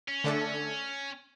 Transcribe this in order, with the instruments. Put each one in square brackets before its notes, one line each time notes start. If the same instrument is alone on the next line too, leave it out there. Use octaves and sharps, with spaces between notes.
[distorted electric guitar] C#4
[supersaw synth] D3 A3 D4 A4